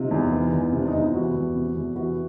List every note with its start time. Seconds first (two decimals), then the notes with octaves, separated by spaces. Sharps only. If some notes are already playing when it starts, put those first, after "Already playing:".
Already playing: C3 D#4 F4
0.11 E2
0.32 E3
0.52 E2
0.72 C3
0.80 D4
0.88 D#4
0.93 E2 E4
1.05 F4
1.14 E3 E4 F#4
1.34 E2
1.54 C3
1.75 E2
1.95 E3 E4 F#4